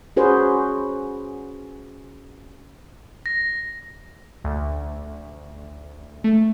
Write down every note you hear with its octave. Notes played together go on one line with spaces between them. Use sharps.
C#4 F#4 G#4 B4 C5
A#6
D2
A3